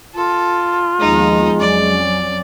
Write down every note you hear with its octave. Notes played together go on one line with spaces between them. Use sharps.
F4 A4
D#2 F3 G#3 B3 D#4
F2 F#3 C#4 D5